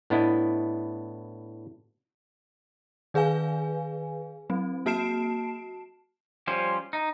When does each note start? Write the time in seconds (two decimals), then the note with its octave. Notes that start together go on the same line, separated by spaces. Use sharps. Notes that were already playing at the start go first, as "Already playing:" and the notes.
0.10 A2 B3 D4 E4 D#5
3.14 D#3 G#4 B4 F5 G#5
4.50 F#3 C4
4.86 A#3 F#4 A5 C7 D7 E7
6.47 F3 G3 C#4 C5
6.93 D#4